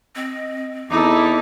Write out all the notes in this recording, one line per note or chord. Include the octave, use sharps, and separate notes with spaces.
C4 D#5
E2 D#4 E4 A4 D6